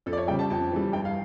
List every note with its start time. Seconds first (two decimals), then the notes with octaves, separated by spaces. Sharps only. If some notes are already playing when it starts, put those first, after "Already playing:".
0.06 F2 A4
0.13 D5
0.18 C#5
0.28 C#3 G3 G5
0.39 A5
0.50 F2 A5
0.72 E3 G3
0.93 G2 G5
1.05 F5